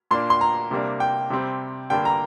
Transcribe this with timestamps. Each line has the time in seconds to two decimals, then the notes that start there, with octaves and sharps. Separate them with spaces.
0.11 A#2 A#3 D4 C6
0.30 C6
0.41 A#5
0.71 C3 G3 A#3 D4
1.00 G5
1.30 C3 G3 C4
1.90 G2 D3 G3 A#3 D4 G5
2.05 A#5